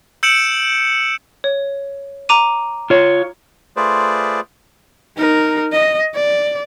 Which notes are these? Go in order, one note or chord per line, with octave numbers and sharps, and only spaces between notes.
E6 G6 C#7 D7 E7 F#7
C#5
A#5 D6 D#7
F4 C#5
A3 F4 G#4 B4 C5 D5
D#4 A#4
D#5
D5